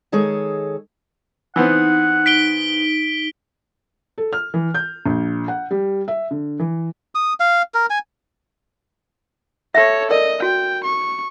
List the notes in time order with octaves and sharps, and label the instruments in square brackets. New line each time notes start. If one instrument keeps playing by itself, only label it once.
[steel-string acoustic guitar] D#3 G#3 G#4 A4 C#5
[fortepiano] E3 B3 C4 [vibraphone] D#4 [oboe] F#5
[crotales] B6 D7 G7
[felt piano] A4
F6
E3
G6
A#1
F#5
G3
E5
D3
E3
[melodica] D#6
F5
A#4
G#5
[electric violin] A4 C#5 [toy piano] E5
[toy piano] A#4 D5 [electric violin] D#5
[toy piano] F#4 [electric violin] G5
[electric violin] C#6